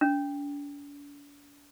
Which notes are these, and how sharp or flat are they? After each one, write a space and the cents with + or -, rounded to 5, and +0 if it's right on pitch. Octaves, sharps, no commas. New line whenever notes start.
D4 -40